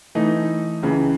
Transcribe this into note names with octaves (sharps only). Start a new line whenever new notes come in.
E3 A3 D#4
C#2 C#3 E3